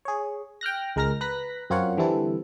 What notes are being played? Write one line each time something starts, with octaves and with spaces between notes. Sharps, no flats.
G#4 C#5
G5 F6 F#6 A#6
C#2 G#3 A#4 A#5 F6 A#6
B4 A#5 F#6 A#6 B6
F#2 C4 F4 A#4 C#5 F#5
D3 E3 G3 C4 E4 A4